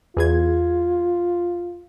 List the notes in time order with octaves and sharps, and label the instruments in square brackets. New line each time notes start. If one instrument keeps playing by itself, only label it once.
[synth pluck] E2 G#4 G#6 [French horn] F4